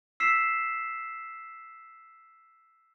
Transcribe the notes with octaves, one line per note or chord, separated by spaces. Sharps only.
E6 B6 C7 E7